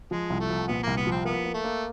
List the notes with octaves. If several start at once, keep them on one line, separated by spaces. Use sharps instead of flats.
F3 G#3
C2
A3
F3
A#2 B3
C2 A#3
B3
F3 C4
A#3 B3
A#3
A3
A#3